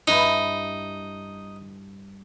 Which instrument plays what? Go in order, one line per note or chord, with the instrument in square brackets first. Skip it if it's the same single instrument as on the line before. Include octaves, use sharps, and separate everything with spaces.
[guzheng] G2 E4 [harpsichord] D#4